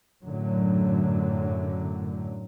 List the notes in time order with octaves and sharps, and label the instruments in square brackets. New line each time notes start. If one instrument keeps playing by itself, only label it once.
[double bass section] F#2 A2 D3 F#3